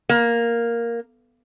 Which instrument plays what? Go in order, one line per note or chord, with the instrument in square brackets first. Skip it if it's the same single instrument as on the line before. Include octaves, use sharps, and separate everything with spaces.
[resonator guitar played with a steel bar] A#3